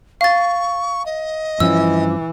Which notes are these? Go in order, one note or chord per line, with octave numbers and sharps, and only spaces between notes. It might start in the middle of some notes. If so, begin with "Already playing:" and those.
F5 C#6 A6
D#5
G2 E3 F3 C#4 E6